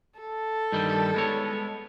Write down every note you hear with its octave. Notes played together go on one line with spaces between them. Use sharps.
A4
G2 D#3 G3
G#3 B3 C#5